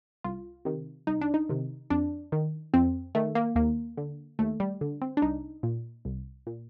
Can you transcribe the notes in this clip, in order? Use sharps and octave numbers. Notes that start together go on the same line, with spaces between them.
C2 F4
C3 D#3
C2 D#4
D4
D#4
C3 D#3
F2 D4
D#3
F2 C4
D#3 A3
A#3
D#2 A#3
D3
D#2 A3
G3
D3
C4
D4
C2 D#4
A#2
C2
A#2